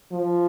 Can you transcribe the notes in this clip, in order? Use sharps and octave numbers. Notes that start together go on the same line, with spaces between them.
F3